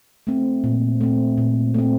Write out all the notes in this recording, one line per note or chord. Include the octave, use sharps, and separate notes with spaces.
A3 C4
A#2
A3 C4
A#2
A3 C4